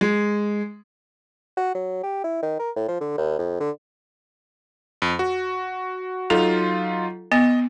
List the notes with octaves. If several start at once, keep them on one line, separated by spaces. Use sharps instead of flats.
G#3
F#4
F#3
G4
E4
D#3
A#4
A2
F3
D3
D#2
F2
D3
F2
F#4
F#3 D#4 F4 A4
B3 D#5